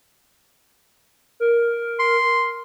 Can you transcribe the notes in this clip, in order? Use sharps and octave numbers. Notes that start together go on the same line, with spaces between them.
A#4
C6